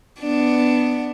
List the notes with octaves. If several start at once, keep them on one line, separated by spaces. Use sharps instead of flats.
B3 D4